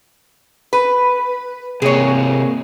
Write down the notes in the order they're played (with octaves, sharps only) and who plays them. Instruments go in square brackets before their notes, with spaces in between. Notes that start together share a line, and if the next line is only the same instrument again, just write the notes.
[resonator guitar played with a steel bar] B4
[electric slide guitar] C3 A#3 [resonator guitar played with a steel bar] G#4 C#5